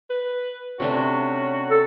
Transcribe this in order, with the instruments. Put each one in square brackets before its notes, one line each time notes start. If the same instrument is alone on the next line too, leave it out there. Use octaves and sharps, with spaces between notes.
[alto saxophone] B4
[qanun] C3 A3 D4 [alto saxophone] C#4 [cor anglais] F#4
[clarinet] A4